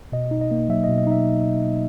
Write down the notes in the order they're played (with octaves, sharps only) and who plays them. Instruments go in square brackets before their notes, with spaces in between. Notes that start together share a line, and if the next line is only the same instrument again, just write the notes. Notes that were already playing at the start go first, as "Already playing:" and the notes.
[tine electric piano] B2 D#5
D#4
D#5
A#3
F#3 E5
B2 D#5
D#5
D#4 E5